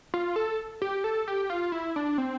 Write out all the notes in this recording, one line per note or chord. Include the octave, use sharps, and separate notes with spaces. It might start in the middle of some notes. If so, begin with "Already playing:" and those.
F4
A4
G4
A4
G4
F4
E4
D4
C4